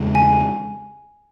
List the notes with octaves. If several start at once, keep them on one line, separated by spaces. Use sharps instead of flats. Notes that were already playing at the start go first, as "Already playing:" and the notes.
Already playing: E2 C#3 G#3
G#5